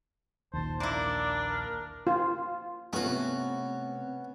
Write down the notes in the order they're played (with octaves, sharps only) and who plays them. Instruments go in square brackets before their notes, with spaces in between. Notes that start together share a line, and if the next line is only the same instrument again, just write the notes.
[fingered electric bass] A#1 D#2 [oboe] C5 [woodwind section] A5
[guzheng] A#3 E4 [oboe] D4 [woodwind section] D5
[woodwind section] A#4
[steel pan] F4
[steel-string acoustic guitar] A3 F4 [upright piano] B3 [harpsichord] C#4 F#4
[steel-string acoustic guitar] C3 [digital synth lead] A3